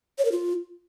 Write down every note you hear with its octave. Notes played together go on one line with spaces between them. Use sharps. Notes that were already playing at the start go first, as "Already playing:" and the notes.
C#5
A#4
F4